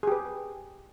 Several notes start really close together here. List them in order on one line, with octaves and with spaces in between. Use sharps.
G#4 G4 B4